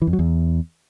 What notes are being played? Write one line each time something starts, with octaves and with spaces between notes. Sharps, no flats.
E3
F2
F#3
E2